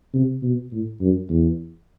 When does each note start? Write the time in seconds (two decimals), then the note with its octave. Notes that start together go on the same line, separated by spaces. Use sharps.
0.14 C3
0.43 B2
0.72 A2
1.01 F#2
1.29 E2